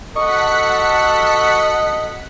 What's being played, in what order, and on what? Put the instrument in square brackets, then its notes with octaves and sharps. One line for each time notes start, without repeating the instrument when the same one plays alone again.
[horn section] F#4 A4 [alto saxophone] D#5 [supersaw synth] F#5 B6 C#7 [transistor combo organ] C#6